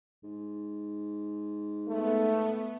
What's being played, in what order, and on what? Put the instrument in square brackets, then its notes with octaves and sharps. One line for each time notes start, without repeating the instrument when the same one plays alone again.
[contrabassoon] G#2
[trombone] A3 [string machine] B3